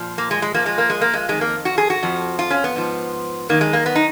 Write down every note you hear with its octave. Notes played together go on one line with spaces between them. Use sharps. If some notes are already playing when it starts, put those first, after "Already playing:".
Already playing: A#2 F3
A#3
G#3
G#3
A#2 F3 A#3
G#3
A#3
G#3
A#3
G#3
F2 D#3 G#3
A#3
F#4
G#4
F#4
F2 F3
F4
C#4
B3
G#2 F3
F#2 D#3 A#3
G#3
A#3
B3
D#4